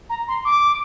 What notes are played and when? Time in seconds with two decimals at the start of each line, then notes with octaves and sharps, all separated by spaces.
0.10 A#5
0.28 C6
0.45 D6